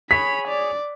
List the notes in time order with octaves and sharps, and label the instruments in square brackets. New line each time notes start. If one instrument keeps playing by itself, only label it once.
[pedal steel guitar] G#4 C#5 [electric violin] B5 [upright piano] B6
[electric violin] D5